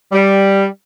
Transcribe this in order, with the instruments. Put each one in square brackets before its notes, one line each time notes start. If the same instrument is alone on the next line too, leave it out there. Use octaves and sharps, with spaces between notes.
[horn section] G3